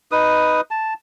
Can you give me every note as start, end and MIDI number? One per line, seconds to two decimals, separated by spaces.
0.12 0.61 63
0.12 0.61 71
0.12 0.61 87
0.71 0.94 81